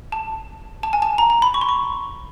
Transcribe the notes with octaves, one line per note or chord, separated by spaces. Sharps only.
A5
A5
G#5
A5
A#5
A#5
B5
C#6
C6
C#6